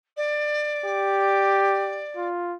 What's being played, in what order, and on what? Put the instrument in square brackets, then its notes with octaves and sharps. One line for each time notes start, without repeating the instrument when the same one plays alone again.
[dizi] D5
[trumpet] G4
F4